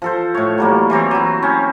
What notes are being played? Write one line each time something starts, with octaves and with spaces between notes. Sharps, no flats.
F3 A4 C5
A2 C#5
F#3 G3 A#3
E3 G3 C4 C#5
F#3 E4
C4 C#4